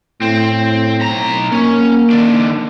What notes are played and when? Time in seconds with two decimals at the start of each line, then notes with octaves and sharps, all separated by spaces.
0.22 A2 C4
1.02 B1 A#5
1.52 A#3 C#4
2.10 D#3 D4